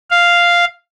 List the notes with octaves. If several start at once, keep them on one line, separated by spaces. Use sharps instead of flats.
F5